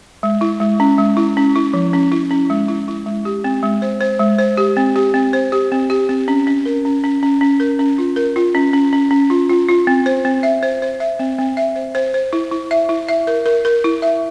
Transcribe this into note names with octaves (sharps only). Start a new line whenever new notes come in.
G#3
E4
G#3
C#4
G#3
E4
C#4
E4
F3
C#4
E4
C#4
G#3
E4
E4
G#3
G4
C4
G#3
C5
C5
G#3
C5
G4
C4
G4
C4
C5
G4
C4
G4
C4
C#4
C#4
A#4
C#4
C#4
C#4
C#4
A#4
C#4
F4
A#4
F4
C#4
C#4
C#4
C#4
F4
F4
F4
C4
C5
C4
E5
C5
C5
E5
C4
C4
E5
C5
C5
C5
E4
E4
E5
E4
E5
A#4
A#4
A#4
E4
E5